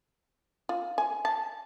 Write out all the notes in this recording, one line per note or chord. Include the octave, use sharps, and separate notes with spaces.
F4
G#5
A5